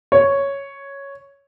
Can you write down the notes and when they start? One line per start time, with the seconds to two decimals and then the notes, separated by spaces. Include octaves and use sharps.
0.12 C#5